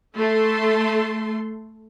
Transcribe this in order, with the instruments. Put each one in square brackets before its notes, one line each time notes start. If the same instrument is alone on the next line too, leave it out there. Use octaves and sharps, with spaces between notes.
[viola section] A3 A4 C6